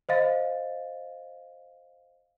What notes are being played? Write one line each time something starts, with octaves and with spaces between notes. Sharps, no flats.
C5 D#5 F5 A6